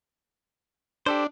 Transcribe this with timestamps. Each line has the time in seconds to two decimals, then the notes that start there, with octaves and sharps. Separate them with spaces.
1.06 D4 G4 A4 C5